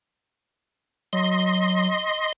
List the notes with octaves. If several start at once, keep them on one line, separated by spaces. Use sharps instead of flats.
F#3 D#5 C6